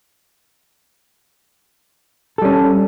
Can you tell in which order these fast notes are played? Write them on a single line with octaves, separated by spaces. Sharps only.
A4 G3 C#4